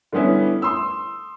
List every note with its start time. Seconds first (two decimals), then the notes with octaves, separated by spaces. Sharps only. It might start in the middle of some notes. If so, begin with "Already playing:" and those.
0.13 D3 G3 B3 C#4 E4
0.62 C6 D#6 E6